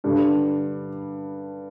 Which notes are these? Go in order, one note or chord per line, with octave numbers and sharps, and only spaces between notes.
G2 D3 G3